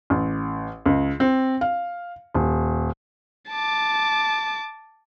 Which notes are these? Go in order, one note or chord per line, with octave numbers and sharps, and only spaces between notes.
A1
C#2
C4
F5
D#1
A5 D6